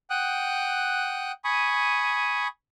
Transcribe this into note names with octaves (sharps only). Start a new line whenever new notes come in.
F#5 G5 D#6 F#6
G#5 B5 C#6 D#6